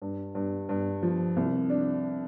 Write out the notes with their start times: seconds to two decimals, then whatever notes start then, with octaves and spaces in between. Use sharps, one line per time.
0.02 G2
0.35 G2
0.69 G2
1.03 F3
1.36 C2
1.70 D4